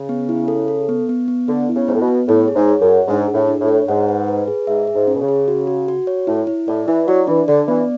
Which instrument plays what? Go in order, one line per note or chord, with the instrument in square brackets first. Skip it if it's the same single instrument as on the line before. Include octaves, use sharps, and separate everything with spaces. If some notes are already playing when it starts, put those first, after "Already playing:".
Already playing: [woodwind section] C#3
[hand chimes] B3
E4
A4
A4
B3
B3
B3
[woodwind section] D3 [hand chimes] B3
[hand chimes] E4
[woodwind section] C#3
[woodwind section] G#2 [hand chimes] B3
[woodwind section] A2
B2
[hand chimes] B3
[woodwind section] A2 [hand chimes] C#5
[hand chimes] G#4
[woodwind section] G#2
[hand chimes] C#5
[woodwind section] F#2
[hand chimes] F#5
[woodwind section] G#2 [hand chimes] D4
[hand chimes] G#4
[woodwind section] A2
[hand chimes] D4
[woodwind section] A2
[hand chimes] C#5
[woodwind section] G#2 [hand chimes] F#5
[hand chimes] B4
B4
G#4
[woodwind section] G#2 [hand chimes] E5
[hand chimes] G#4
[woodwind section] G#2
[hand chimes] C#4
[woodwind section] B2
C#3
[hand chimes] G#4
F#4
F#4
F#4
C#5
[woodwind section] A2 [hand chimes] E4
[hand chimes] E4
[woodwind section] A2 [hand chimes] D5
[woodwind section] E3 [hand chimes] E4
[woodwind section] F#3 [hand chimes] D5
[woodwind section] E3 [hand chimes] D4
[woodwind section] D3 [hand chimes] D5
[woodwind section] E3 [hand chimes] B3